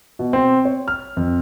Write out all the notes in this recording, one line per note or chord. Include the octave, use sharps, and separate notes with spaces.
B2
C4
C#5
F6
F2